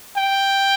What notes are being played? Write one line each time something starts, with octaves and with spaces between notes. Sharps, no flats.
G5